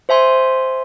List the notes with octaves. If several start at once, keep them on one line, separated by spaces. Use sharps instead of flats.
C5 E5 G#5 C6